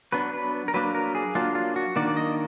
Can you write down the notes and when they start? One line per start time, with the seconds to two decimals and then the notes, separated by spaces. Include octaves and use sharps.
0.12 F#3 B3 D4 B4
0.33 B4
0.68 A#4
0.74 F#3 A#3 D4 B4
0.95 A#4
1.15 G#4
1.35 F#3 A#3 D4 F4
1.55 F4
1.76 F#4
1.96 D#3 A#3 D4 D5
2.17 D#5